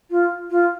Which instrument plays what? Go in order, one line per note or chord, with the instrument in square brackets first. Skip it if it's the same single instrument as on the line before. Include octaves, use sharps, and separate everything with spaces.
[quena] F4
F4